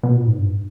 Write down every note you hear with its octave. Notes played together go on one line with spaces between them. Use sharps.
B2
A#2
G#2
G2